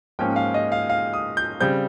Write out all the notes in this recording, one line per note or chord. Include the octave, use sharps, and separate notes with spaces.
G#2 F3 A#3 C#4 G5
F5
D#5
F5
F5
D#6
G6
C#3 G3 C4 G6